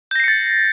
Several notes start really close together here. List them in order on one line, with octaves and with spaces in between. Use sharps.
G6 A#6 C7 C#7 A6